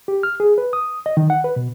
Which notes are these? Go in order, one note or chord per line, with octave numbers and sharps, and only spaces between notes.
G4
F6
G#4
B4
D#6
D#5
D#3
F#5
B4
B2